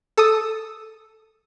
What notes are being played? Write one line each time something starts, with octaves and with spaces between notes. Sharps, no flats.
A4 D#6